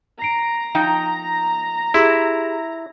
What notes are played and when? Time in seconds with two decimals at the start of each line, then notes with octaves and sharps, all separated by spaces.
0.22 A#5 C7 D7
0.75 F3 D#4 G5
1.94 E4 G4 G#4 C6